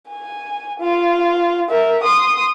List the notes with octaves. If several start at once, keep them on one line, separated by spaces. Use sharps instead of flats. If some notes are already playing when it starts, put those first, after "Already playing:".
G#5
F4
A#4 E5
C6 D#6